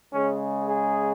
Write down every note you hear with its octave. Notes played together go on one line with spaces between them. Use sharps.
C#3 G#3 C#4
G#4